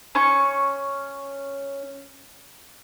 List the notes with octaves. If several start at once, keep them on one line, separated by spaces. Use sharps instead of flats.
C#4 C#6